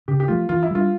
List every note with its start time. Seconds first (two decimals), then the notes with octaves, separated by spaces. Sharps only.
0.08 C#3 G4
0.20 G4
0.28 F3 A3 F4
0.49 E3 F4
0.63 E4
0.71 G3 D4 F4